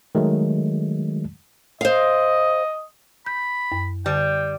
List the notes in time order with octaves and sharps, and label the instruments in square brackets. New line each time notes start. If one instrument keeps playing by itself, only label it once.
[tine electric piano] D#3 F#3 G#3 A3
[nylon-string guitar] C5 F5 [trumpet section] D#5
[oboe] B5 [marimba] G6
[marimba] F#2
[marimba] D3 [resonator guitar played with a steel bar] G3 [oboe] G5